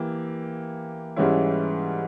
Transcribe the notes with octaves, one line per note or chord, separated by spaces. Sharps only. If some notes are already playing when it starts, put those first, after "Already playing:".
Already playing: E3 A#3 E4 G4
G#2 E3 G3 C#4 E4